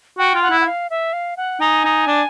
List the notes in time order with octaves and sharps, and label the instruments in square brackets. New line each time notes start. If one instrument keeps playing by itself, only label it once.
[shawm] F#4 [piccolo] G5
[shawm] F4
[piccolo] F#5
[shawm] E4
[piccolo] F#5
F5
E5
F5
F#5
[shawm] D#4 [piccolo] G#5
[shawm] D#4
D4